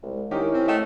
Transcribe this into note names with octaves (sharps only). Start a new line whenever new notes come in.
C2 G#3
D#3 C#4 D#4 E4 G4 A#4
C4
A3 D#5 G5 E7